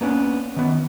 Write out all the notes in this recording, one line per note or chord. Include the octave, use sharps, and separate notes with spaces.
A#3 B3 C#4 D4
D#3 B3